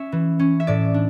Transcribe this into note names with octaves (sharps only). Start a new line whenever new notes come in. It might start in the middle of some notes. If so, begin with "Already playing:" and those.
Already playing: C#4 E5
E3
C#4
E5
A2 D5
D4